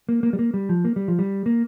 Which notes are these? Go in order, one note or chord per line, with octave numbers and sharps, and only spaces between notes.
A#3
A#3
G3
A#3
G3
F3
A#3
G3
F3
G3
A#3